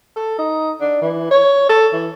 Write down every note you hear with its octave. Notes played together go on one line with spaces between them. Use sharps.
A4
D#4
D4
E3
C#5
A4
E3